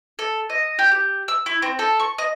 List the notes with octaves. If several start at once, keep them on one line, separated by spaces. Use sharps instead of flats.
A4
D#5
G4
G4
E6
E4
C4
A4
C#6
D#5